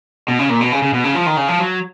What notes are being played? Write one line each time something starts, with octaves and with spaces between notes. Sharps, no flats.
B2
C#3
A#2
B2
C#3
C#3
B2
C#3
F3
D#3
C#3
F3
F#3